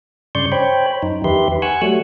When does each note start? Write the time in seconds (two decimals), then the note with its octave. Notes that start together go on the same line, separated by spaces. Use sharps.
0.35 G2 C#3 D5 C6 C#6 G6
0.52 C5 C#5 G5 B5
1.02 F#2 D#4
1.24 E2 D#3 G4 B4 E5 C6
1.62 F#5 G#5 C#6 E6 F#6
1.82 F#3 G3 A3